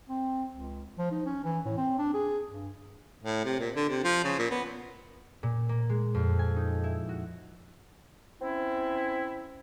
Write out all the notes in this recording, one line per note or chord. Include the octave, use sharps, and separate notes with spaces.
C4
C#2
F3
D#4
C#4
E3
A2
C4
D4
G#4
G2
A2
C3
A#2
D3
C3
F3
C#3
A#2
B3
A#2
A#3
G#3
F2
G#5
D#4
E4
F#4
C4 C#4 E4